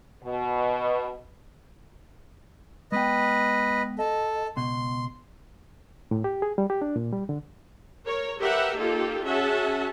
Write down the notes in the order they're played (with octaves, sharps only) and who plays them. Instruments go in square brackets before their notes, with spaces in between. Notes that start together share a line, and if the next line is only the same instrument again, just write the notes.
[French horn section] B2
[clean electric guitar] G#3 B3 G5 [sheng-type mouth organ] B4 D#5
[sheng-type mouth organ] A4 [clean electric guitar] D#5
[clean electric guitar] C#2 B2 [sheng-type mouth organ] C6
[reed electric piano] A2
G4
G#4
G3
G4
D4
A#2
G3
D3
[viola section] A#4 C#5
G4 A#4 B4 E5 F#5
A#3 D#4 F4 G4 A4
C#4 F#4 G#4 E5 F#5 A5